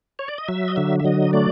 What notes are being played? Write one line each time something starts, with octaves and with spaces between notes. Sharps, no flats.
C#5
D5
D#5
F#3 E5
D#5
D3 E5
E5
F#3 D#5
A3 D5